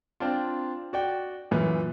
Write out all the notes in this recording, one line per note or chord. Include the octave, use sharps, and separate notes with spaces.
C4 D4 F4
F#4 D5 G5
F#2 A#2 E3